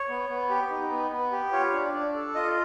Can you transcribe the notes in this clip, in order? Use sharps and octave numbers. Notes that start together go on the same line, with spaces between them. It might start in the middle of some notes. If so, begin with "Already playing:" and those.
Already playing: C#5
B3
B3
G4
D#4
B3
B3
G4
F4 C#5
D4
D4
A4
F4 D#5